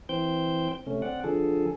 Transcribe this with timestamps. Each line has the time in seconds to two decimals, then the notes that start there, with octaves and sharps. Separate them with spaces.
0.09 E3 C4 C5 G5 G6
0.86 C3 A3 C#4
1.02 C4 D5 F#5
1.24 D3 F3 G#4 A4